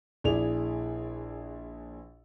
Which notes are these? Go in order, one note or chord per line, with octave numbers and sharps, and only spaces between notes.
A#1 E4 G#4 D5 F7